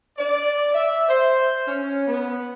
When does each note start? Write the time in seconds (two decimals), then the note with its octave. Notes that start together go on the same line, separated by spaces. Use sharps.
0.18 D5
0.74 E5
1.09 C5
1.67 C#4
2.07 B3